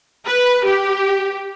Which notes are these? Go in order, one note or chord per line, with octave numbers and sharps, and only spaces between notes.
B4
G4